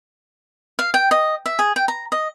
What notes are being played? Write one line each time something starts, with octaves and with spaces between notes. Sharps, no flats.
F5
G5
D#5
E5
G#4
G5
A#5
D#5